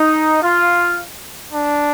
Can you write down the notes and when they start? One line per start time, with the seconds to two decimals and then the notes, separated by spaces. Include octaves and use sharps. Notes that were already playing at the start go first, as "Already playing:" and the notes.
Already playing: D#4
0.43 F4
1.53 D4